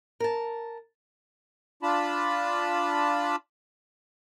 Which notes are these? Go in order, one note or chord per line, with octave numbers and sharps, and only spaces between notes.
A#4 A5
D4 F4 A5 B5